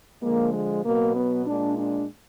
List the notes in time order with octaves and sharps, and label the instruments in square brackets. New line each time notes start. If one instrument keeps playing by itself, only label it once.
[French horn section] D3 F3 G#3 A#3
G#3
B2 F#3 A#3
B3
A#2 G#3 D4
D4